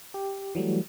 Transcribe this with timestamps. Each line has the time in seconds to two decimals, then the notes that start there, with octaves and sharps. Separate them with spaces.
0.14 G4
0.55 E3 F#3 G3 A3